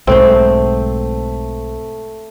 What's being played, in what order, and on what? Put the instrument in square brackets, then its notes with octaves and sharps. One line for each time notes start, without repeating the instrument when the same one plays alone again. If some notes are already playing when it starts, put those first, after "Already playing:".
[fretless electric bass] B1 G#2 [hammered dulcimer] A3 [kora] C4 C5